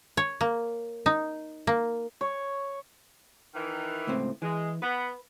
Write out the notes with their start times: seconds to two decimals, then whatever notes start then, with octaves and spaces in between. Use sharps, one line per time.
0.17 C#5
0.41 A#3
1.06 D#4
1.67 A#3
2.21 C#5
3.55 D#3 E3
4.07 C#2 A2 C4
4.42 E3 G#3
4.82 B3 B4